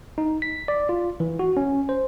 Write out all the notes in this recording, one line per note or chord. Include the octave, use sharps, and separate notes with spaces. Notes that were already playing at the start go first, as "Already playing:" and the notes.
D#4
B6
D5
F4
E3
F#4
C#4
C5